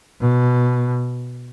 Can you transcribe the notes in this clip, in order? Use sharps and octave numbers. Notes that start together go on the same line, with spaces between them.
B2